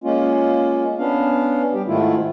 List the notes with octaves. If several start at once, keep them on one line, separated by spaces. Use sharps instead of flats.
G#3 A#3 C#4 F4
B3 C#4 D4 F5
G3 G4
G#2 D#3 A3 E4 F4